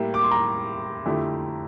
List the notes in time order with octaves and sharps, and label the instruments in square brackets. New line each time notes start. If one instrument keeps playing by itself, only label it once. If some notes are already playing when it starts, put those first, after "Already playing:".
Already playing: [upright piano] A2 G3 A#3 E4 G4
[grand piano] D6
C6
A#5
[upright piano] F2 D3 A3 E4 G4